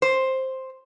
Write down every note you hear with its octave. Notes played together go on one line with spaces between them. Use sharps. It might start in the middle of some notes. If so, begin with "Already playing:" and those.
C5